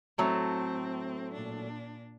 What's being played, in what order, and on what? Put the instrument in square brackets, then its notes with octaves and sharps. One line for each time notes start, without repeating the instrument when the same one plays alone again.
[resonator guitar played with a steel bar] A2 F#3 A3 [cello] C4
[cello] A#2 D4